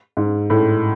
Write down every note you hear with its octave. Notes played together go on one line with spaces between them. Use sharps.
G#2
A2